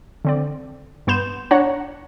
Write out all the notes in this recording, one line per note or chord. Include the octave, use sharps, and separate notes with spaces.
D3 C4 D5
G2 B3 C6 G6 E7
D4 C#5 F#5 A#5